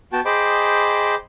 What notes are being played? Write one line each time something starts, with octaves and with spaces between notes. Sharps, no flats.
B3 F#4 G5 A5
G#4 C5 D#5 G5 B5 D6